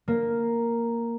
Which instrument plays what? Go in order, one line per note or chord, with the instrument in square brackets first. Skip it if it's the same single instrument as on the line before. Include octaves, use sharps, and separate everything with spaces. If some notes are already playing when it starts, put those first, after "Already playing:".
[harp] A#3